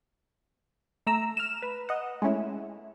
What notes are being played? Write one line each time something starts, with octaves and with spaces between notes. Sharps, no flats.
A3 A#5 E6
F6 E7
B4
D#5 F#5
G#3 A3 C#4 E4